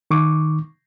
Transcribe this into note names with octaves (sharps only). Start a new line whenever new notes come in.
D#3 C#6 D6